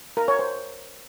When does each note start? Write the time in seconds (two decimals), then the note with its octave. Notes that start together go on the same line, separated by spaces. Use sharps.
0.17 A#4
0.28 C#5
0.39 C5